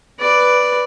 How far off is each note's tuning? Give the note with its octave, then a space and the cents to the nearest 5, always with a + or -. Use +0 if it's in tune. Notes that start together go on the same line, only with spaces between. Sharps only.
B4 +0 D5 +0